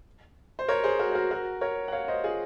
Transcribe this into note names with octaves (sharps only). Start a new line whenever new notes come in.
C5
A#4 C#5
G#4 C5
F#4 A#4
C5
F#4 A#4
F#4 A#4
A#4 C#5
F#5
C#5 F5
C5 D#5
F4 G#4